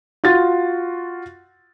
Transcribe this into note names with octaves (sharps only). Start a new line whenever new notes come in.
F4 F#4 A6